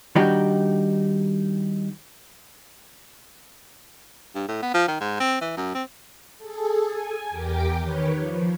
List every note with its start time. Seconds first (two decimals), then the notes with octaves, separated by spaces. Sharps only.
0.15 D#3 G3 D4 D#4 F#4 G4
4.35 G2
4.48 A2
4.62 B3
4.74 F3
4.88 D#3
5.01 G#2
5.20 C4
5.42 E3
5.57 F#2
5.74 C4
6.38 G#4 A4
6.88 G#5
7.30 E2 G4 A#4 G5 D6
7.81 D#3 B4 C#5
8.17 F3